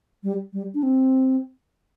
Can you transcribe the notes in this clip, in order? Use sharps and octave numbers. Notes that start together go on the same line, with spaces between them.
G3
G3
D4
C4